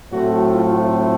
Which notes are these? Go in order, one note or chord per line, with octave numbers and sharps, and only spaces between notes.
A2 F#3 A3 C4 F#4
F4